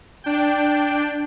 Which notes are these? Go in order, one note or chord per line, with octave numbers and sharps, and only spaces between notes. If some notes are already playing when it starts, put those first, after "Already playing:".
D4 G5